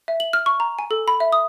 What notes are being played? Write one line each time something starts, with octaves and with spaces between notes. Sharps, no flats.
E5
F#7
F6
C#6
A#5
G#5
A4
B5
E5
D#6